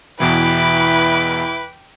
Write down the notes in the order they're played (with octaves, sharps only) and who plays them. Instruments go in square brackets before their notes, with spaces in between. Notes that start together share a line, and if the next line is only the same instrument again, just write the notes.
[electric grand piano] E2 B2 E3 [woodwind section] E4 B5 [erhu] B4 [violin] G5 D6